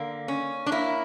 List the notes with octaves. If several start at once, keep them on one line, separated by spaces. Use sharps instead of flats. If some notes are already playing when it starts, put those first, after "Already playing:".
Already playing: D3 A#3
C#4
D4
A#3 E4